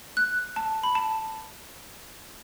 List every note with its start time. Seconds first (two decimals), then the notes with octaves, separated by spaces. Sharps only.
0.17 F#6
0.56 A5
0.83 B5
0.95 A5